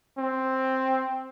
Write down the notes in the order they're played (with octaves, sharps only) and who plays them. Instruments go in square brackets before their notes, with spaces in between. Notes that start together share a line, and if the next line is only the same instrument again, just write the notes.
[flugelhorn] C4